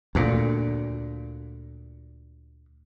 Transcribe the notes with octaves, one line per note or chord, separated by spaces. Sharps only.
D2 A#2